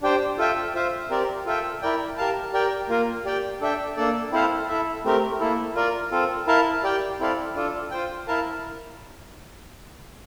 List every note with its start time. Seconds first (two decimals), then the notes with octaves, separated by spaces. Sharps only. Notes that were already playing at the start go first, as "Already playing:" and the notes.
0.02 D4 G4 C5 G5
0.38 F4 A4 E5 G5
0.75 F4 C5 E5
1.10 C4 G4 A#4 D5
1.45 F4 A4 E5 G5
1.82 E4 A#4 D5 G5
2.17 G4 A#4 F5 A5
2.53 G4 A#4 D5 G5
2.89 A#3 F4 A#4
3.25 G4 D5 G5
3.61 D4 A4 E5 G5
3.97 A#3 D4 A4 D5
4.32 C4 E4 A4 C5 F5
4.68 E4 A4 E5
5.05 A3 C4 G4 A#4
5.40 A#3 E4 A4
5.75 F4 A#4 D5
6.11 C4 F4 A4
6.47 E4 A#4 F5 A5
6.84 G4 D5 G5
7.20 C4 E4 A4 D5 F5
7.55 D4 F4 A4
7.91 F4 C5 G5
8.27 E4 A#4 F5 A5